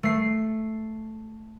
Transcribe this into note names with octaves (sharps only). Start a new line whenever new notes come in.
A3 C7